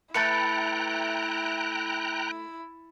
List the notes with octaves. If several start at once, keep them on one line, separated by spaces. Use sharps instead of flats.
A3 E4 B4 G5 A#5 F#6 A6 C#7